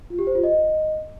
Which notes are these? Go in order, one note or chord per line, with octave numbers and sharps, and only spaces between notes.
F4
G4
C5
F4
D#5